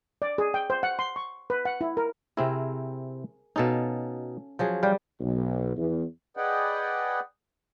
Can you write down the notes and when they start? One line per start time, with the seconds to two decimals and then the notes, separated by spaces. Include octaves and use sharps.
0.22 D5
0.38 G#4
0.54 G5
0.70 C5
0.83 F#5
0.99 C6
1.16 C#6
1.50 B4
1.65 F#5
1.81 E4
1.97 A#4
2.37 C3 C4 E4 G#4 A#4
3.56 B2 C#4 D#4 A4 F5
4.59 F3 F#3 G#4
4.83 G3 F5 G5
5.20 B1
5.77 E2
6.37 G#4 B4 D5 D#5 F#5 G5